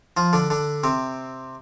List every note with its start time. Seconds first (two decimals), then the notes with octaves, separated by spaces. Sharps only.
0.17 F3 F4
0.33 D3 D4
0.50 D3 D4
0.84 C3 C4